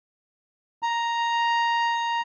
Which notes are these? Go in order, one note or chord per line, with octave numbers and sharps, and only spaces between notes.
A#5